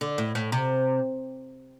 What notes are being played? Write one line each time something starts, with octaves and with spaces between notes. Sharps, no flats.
D3
A2
A2
C3